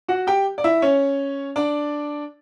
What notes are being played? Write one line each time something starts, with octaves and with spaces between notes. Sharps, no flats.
F#4 F#5
G4 G5
D5
E4 E5
C#4 C#5
D4 D5